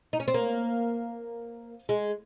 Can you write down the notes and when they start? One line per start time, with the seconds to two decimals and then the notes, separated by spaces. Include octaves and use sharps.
0.13 D#4
0.20 C#4
0.28 C4
0.34 A#3
1.89 G#3